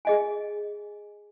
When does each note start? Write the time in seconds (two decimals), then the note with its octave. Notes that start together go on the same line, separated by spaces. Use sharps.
0.05 G#4 D#5 G#5